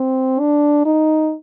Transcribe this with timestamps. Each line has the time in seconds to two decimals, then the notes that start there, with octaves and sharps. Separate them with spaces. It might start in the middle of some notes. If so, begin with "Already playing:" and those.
Already playing: C4
0.39 D4
0.85 D#4